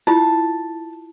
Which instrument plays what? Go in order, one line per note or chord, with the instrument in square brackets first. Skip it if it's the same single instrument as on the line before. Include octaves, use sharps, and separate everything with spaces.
[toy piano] E4 F4 [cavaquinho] A5